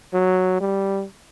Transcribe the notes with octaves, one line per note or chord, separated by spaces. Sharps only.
F#3
G3